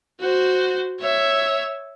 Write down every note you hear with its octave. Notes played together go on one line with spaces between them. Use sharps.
F#4 C5
C#5 E5